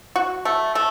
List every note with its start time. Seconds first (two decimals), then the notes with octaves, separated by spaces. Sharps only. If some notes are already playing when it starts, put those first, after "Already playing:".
0.16 F#4
0.45 A3
0.75 A3